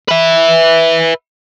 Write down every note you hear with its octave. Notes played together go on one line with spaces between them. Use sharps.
B4 E5